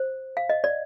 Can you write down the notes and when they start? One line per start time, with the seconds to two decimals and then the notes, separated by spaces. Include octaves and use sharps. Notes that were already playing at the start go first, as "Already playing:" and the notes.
Already playing: C5
0.37 F5
0.49 D#5
0.64 D5